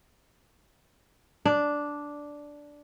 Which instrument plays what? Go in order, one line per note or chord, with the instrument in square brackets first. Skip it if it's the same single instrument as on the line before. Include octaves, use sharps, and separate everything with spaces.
[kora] D4